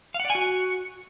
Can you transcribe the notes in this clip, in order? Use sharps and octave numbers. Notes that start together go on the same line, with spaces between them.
F5
F#5
D5
G#5
F#4